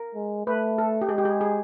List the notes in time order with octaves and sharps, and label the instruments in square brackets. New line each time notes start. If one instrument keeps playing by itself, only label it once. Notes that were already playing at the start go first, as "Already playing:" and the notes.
Already playing: [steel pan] A#4
[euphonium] G#3
[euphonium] A3 [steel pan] B4
[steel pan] A4
G4
[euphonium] G#3 [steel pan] G#4
[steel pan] G4
G#4
G#4